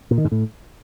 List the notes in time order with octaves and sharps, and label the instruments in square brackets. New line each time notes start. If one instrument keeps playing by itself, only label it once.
[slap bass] A#2
D#3
G#2
A2